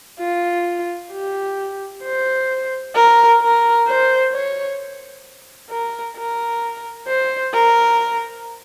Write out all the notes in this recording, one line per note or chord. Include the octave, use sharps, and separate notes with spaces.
F4
G4
C5
A#4
A#4
C5
C#5
A#4
A#4
C5
A#4